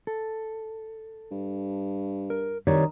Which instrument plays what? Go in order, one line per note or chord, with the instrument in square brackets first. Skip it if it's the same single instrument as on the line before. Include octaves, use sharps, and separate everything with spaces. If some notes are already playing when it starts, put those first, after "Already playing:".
[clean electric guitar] A4
[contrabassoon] G2
[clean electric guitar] A#4
[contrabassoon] C2 [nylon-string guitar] D#3 [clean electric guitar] G4 C#5 D5